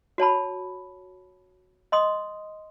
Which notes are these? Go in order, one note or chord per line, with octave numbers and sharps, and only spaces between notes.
F#4 C#5 A5 B5
D#5 C6 D#6